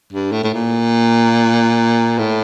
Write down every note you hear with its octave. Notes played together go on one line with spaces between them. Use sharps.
G2
A2
A2
A#2
A2